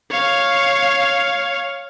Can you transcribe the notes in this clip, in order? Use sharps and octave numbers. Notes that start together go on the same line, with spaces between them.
C#5 F5